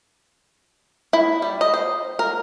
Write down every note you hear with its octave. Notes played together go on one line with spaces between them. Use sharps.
E4
G3
D#5
C5
A#4